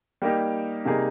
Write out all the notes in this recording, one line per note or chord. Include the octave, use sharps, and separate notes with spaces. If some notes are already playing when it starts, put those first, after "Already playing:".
G3 A#3 D#4 G4
C3 G3 A#3 D#4 G#4